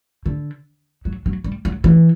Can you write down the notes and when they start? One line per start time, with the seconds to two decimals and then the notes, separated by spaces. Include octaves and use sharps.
0.26 D3
1.05 F#3
1.26 F#3
1.44 G3
1.65 F#3
1.84 E3